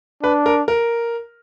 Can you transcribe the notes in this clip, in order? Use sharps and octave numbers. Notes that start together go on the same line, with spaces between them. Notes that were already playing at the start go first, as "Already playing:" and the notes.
D4 B4
A#4
A#4